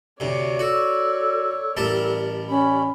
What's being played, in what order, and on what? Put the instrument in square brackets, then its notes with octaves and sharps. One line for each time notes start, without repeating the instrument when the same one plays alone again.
[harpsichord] D2 C3 [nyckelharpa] C#5 D5
[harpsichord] F#4 [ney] A4
[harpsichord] A1 G3 A5 [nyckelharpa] A#4
[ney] C#4 [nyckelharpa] B5